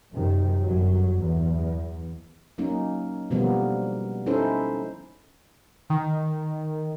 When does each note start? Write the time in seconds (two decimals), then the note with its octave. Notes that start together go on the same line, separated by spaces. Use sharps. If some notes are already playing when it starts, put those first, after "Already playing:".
0.12 F#2 C3 D#3
0.63 G1 F#2 F#3
1.20 E2
2.58 F#3 A#3 C#4 D#4
3.30 B2 D3 F3 G3 A#3 B3
4.26 C#4 D#4 E4 A4 C5
5.90 D#3